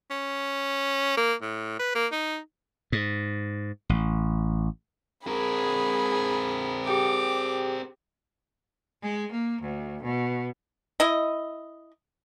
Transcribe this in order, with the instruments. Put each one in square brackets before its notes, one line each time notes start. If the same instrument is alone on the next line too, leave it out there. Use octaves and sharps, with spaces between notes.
[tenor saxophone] C#4
A#3
A2
B4
A#3
D#4
[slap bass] G#2
A1
[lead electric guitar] C4 A#4 [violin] G#4 B5
[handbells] G4 G#4 G5 [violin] D6
[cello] G#3
A#3
D2
B2
[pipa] E4 D#5